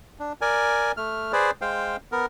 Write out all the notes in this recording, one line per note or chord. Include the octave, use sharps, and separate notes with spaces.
D4
A#4 D5 G#5
A3 F6
G#4 B4 C5 D5
G#3 C5 F5 G5
B3 A#4